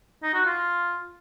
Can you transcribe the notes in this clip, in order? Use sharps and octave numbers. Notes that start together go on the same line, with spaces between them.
D#4
F#4
F4